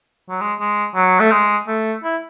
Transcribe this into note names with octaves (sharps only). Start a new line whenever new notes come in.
F#3
G#3
G#3
F#3
A3
G#3
A3
E4